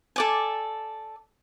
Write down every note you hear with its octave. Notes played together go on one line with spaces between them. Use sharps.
A4 D5 G#5